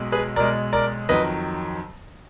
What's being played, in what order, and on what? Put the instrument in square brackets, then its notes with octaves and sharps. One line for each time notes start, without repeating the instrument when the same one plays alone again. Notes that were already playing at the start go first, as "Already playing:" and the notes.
Already playing: [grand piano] B1 B2 G#3
G#4 B4
B1 B2 G#3 A#4 D5
A#4 D5
F2 D#3 F#3 B4 D#5